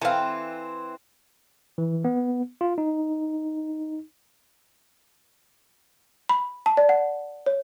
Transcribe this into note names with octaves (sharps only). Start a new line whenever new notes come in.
E3 C4 A4 B4 F5
E3
B3
F4
D#4
B5
A5
D5
F#5
C#5